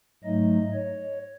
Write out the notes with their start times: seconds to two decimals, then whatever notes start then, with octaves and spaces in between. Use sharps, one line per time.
0.23 G#2 F#3 A3 D#4 D#5
0.73 C#5